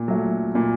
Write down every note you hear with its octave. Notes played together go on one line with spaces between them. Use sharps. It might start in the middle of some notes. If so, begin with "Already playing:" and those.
Already playing: A#2
F#3 A3
A#2